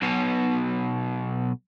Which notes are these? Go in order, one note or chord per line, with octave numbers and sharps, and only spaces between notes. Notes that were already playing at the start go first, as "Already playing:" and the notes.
B1 B2